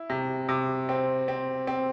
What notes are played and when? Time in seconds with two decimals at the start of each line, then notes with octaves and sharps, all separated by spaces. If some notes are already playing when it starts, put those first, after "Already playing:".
Already playing: E4
0.10 C3
0.49 C3
0.89 C4
1.28 C4
1.67 C4